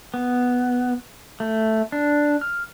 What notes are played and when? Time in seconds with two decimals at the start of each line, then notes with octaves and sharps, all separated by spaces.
0.14 B3
1.40 A3
1.92 D4
2.41 F6